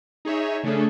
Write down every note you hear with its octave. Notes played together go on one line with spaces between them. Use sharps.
D#4 G#4 C#5 E5
C#3 A3 C#4 D4 G#4 A4